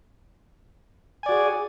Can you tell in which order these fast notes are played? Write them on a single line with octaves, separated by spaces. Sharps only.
G#5 D5 F#4 G#4